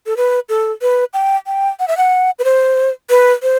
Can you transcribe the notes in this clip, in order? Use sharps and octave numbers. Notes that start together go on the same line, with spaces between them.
A4
B4
A4
B4
G5
G5
F#5
E5
F#5
B4
C5
B4
C5